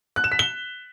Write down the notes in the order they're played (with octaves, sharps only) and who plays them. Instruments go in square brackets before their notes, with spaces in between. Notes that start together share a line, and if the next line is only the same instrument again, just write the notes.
[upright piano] F#6
E7
B6
G7